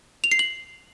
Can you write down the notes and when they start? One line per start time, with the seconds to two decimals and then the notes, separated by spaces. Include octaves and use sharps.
0.24 F7
0.31 C7
0.39 F#7